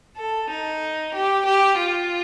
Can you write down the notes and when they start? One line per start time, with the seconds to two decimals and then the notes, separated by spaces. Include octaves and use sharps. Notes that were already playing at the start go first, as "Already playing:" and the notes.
0.17 A4
0.49 D#4
1.14 G4
1.45 G4
1.78 F4